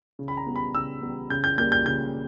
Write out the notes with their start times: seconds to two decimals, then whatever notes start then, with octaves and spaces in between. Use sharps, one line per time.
0.19 C#3
0.28 B5
0.37 A#5
0.46 G3 B3
0.56 B5
0.74 C#3 E6
1.02 G3 B3
1.30 C#3 G6
1.44 G6
1.58 G3 A#3 G6
1.72 G6
1.86 C#3 G6